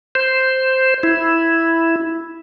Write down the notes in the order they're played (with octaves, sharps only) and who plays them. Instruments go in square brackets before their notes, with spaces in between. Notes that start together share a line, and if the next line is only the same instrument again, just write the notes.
[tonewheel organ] C5
E4